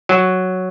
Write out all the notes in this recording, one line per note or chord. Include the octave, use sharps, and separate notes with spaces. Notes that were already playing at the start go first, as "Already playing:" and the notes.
F#3